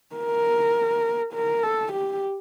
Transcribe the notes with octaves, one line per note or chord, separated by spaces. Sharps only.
A#4
A#4
A4
G4